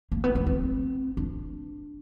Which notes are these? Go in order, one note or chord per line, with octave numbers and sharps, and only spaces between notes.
A#3
B3
B3
C4
D4